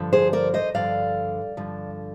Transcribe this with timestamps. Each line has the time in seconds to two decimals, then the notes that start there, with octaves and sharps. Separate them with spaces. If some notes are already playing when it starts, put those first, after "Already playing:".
Already playing: G2 D3 F3
0.13 G#4 C5
0.33 A#4 D5
0.54 C5 D#5
0.74 G2 D3 F3 D5 F5
1.57 G2 D3 F3